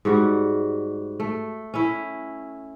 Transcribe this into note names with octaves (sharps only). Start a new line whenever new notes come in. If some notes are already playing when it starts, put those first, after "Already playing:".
G#2 G3 F#4
A3
C#4 E4